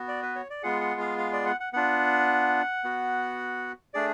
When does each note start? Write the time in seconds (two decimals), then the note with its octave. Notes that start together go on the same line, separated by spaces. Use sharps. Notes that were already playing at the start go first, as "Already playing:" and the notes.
Already playing: B3 F#4
0.08 D5
0.22 B4
0.35 C#5
0.50 D5
0.63 G#3 B3 F4 G#4 F#5
0.81 F#5
1.00 F5
1.18 F5
1.33 D5
1.46 F#5
1.60 F#5
1.73 B3 D4 F4 F#5
2.84 B3 F#4
3.94 A3 D4 G#4 D5